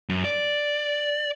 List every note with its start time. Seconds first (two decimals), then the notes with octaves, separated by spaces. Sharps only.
0.09 F#2
0.25 D5